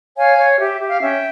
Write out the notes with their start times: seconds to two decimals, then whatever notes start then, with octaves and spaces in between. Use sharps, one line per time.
0.16 C#5 F5 G#5
0.37 C#5
0.59 G4 E5
0.80 G4
0.90 F5
1.00 C#4 E5 G5